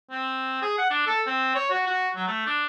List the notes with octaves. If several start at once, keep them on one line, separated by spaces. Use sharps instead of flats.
C4
G#4
F#5
D4
A4
C4
C#5
F#4
F#4
F#3
A3
D4